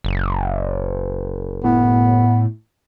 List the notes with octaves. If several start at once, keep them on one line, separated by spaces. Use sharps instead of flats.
F#1
A2 B3